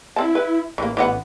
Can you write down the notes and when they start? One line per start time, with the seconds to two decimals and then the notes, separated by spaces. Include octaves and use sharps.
0.16 C4 E4 A5
0.35 B4
0.78 A1 E3 A#3
0.97 E3 B3 F#5